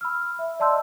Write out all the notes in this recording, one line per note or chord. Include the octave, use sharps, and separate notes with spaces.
B5 E6 F6
E5
D5 D#5 A5 C6 E6 G6